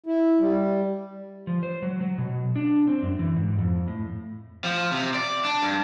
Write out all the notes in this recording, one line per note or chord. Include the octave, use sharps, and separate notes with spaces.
E4
G3
F3
C5
F#3
F#3
B2
D4
C4
F#2
E3
G#2
F2
A2
F3
C3
D5
D4
G2